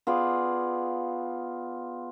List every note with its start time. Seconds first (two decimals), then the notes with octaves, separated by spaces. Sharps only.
0.07 B3 F4 G#4 D5